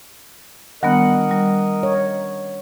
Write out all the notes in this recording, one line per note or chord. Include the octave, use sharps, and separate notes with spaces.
D#3 G3 B3 D4 A#4 D#5 F#5
G3
C#5